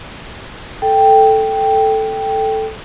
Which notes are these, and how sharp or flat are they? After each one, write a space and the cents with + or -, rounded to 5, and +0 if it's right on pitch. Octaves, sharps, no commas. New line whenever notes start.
A4 +0 G5 +0